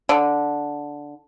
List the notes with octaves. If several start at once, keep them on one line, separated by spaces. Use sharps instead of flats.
D3